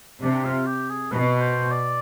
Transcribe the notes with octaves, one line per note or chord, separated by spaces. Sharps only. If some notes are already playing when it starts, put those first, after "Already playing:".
C3 D4
F4
G4
G#4
B2 B4
C5
D5